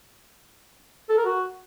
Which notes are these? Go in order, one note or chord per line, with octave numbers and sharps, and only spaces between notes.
A4
A#4
F#4